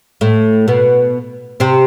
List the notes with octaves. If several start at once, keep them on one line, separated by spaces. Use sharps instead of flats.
A2 A3
B2 B3
C3 C4